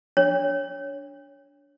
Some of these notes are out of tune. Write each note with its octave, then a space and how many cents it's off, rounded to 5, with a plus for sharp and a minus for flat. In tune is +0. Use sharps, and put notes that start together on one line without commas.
D4 -20 C#5 +0